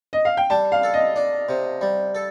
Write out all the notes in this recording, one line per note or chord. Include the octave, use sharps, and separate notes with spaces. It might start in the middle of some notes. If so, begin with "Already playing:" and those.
D#5
F5
G5
G3 A5
F5
A4
D#5
D4
C3
G3
A4